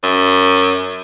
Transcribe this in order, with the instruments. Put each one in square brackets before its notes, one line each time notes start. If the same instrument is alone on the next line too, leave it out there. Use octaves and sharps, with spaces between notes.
[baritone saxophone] F#2